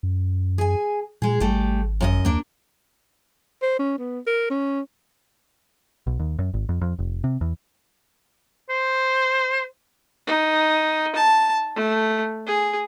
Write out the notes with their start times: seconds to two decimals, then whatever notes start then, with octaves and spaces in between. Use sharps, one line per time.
0.03 F#2
0.58 G#4 G#5
1.22 A#2 G#3 G#4
1.40 G#1 G3 A3
2.01 F#2 F#4 D#5
2.25 D#2 A#3 D4
3.62 C5
3.79 C#4
3.99 B3
4.27 A#4
4.50 C#4
6.07 B1
6.19 D#2
6.39 F#2
6.54 G#1
6.69 F2
6.81 F2
6.99 F1
7.24 C3
7.41 E2
8.69 C5
10.27 D#4
11.15 A5
11.76 A3
12.46 G#4